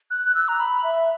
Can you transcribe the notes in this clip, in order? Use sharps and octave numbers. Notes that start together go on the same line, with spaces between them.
F#6
E6
A#5
B5
E5